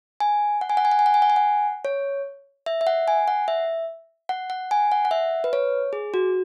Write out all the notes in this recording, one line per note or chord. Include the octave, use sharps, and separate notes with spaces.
G#5
F#5
G#5
F#5
G#5
F#5
G#5
F#5
G#5
F#5
G#5
F#5
C#5
E5
E5
F#5
G#5
F#5
E5
F#5
F#5
G#5
F#5
F#5
E5
B4
C#5
G#4
F#4